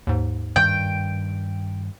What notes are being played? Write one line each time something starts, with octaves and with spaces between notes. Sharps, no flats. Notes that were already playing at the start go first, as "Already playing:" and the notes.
D#2 G#2
G2 D#3 G5